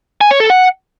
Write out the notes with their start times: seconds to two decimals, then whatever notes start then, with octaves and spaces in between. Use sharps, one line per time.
0.21 G#5
0.31 C#5
0.40 A4
0.50 F#5